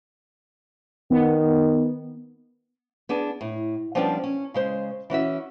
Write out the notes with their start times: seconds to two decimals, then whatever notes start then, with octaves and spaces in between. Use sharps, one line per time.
1.11 D#3 B3
3.09 B3 D4 G#4
3.41 A2
3.95 F3 G3 B3 C#4 D4 F4
4.24 C#4
4.54 C#3 G#3 C5
5.10 E3 C#4 F#4 E5